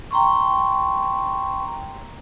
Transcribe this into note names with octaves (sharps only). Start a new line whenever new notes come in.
G5 A#5 C6 C#6